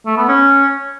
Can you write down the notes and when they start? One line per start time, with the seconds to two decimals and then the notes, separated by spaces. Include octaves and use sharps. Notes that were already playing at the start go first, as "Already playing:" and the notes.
0.06 A3
0.17 B3
0.29 C#4